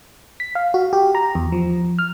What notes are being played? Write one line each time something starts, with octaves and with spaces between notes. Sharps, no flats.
B6
F5
F#4
G4
A#5
E2
F3
F6